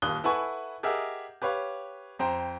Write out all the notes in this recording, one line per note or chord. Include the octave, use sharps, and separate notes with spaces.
D#1 D#2 D#6 F#6 G7
E4 A4 B4 F#5 G#5 C#6
G4 G#4 A#4 D#5 E5 F#5
G4 B4 C#5 F5
F2 C5 G5 A#5